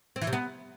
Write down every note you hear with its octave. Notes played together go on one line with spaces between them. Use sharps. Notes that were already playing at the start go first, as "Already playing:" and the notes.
C4
E3
C3
B3